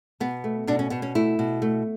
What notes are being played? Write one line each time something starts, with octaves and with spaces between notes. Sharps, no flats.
B2 B3
A3
B2 D4
C#4
B2 B3
C#4
A3 E4
B2
A3